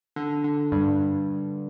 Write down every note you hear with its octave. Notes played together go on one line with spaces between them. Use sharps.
D3
D3
G2